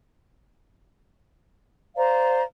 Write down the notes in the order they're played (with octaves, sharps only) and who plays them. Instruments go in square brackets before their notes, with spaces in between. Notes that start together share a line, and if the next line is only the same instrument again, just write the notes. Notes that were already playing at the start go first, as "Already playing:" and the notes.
[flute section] C5 D5 F5 A#5